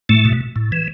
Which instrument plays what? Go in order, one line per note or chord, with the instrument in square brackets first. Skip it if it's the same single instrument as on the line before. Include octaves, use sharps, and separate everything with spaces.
[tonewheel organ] A2 A3
B2
A2
E3